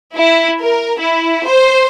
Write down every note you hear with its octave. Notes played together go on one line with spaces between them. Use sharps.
E4
A#4
E4
C5